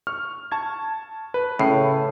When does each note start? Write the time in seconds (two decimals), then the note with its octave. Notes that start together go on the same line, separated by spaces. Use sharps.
0.07 C#6 F6
0.52 A5 C#6 G#6
1.34 B4
1.59 A2 C#3 C7